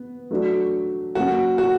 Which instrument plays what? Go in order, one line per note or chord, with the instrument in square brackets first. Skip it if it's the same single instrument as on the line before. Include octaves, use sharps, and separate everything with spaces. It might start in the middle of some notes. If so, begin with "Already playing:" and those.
Already playing: [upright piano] B3
F#3 A3 D4 F#4
[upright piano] F#3 A#3 C#4 [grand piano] F#4
[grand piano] F#4